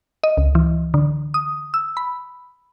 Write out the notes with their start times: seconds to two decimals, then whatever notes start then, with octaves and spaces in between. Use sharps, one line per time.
0.24 D#5
0.37 C#2
0.55 E3
0.94 D3
1.34 D#6
1.74 E6
1.97 B5